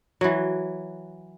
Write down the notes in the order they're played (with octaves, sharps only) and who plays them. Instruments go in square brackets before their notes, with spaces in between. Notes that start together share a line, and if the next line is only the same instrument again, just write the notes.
[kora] E3 F#3